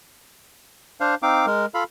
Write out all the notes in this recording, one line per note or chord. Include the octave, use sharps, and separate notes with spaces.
D4 C5 F5
C4 D#4 F5 D6
G#3 A#4
F4 A4 F5 B5